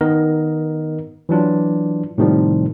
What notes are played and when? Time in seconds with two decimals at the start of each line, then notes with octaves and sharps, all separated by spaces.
0.01 D#3 B3 A#4 D#5
1.29 E3 F#3 D4 F4
2.18 A2 C3 D#3 F3 G3